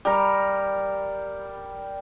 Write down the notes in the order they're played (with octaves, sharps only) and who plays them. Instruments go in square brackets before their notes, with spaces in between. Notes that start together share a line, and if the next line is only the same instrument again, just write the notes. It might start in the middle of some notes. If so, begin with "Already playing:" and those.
[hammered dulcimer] G3 A#4